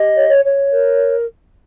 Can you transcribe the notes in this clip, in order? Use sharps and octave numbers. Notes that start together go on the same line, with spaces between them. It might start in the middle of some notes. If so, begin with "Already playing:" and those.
Already playing: G4 D#5
C#5
C#5
C#5
A#4